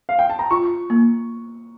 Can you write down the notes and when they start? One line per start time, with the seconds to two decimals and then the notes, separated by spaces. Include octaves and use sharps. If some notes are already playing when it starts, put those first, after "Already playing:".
0.09 F5
0.19 G5
0.30 A5
0.39 A#5
0.50 F4 C#6
0.90 A#3